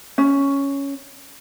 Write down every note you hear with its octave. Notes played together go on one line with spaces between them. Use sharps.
C#4